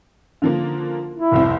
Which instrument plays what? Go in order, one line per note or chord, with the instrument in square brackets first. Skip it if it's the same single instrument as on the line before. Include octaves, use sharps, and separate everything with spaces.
[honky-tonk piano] D3 F3 A#3
[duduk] E4
[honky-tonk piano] F1 C2 C4